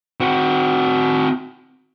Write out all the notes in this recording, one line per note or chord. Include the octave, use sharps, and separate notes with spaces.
C4 F#4